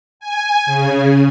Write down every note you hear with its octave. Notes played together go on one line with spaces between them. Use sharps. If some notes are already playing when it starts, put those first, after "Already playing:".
G#5
C#3